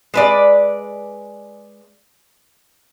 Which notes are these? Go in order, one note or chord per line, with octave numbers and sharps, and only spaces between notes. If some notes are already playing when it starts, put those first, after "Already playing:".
G#3 B4 D5